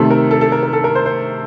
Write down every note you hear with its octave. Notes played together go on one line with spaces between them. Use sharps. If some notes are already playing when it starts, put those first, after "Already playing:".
Already playing: C3 D#3 A3 A4
A#4
A4
A4
A#4
A#4
A4
A#4
C5
C5